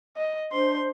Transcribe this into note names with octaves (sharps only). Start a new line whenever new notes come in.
D#5
D4 C5 C6